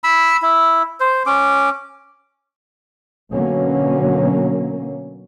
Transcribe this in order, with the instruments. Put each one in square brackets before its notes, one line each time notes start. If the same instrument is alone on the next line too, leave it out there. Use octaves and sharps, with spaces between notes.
[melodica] B5 E6
E4
C5
C#4 D6
[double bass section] B2 D3 F#3 A#3 C#4